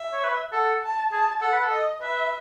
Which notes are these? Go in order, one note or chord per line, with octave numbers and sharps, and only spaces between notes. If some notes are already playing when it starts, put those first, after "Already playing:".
Already playing: E5
C#5
B4
A4 F#5
A5
G#4 A5
A4 F#5
B4
A4
D#5
B4 E5